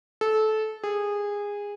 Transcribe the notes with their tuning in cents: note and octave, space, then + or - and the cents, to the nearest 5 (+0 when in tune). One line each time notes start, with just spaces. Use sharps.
A4 -20
G#4 -20